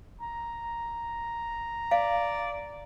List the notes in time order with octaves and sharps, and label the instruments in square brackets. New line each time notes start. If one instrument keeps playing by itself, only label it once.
[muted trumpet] A#5
[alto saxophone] D5 [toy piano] F5